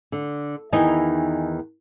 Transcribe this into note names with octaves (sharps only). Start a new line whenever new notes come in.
D3
E2 D#3 E3 D#4 D#5 G#5